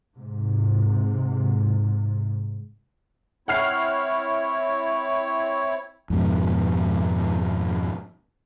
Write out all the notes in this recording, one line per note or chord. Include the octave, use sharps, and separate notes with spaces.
G#2 C3
C4 E4 C#5 F#5 F6 C7
F2 G#2 B2